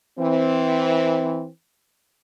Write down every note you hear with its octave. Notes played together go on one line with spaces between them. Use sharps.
E3 C4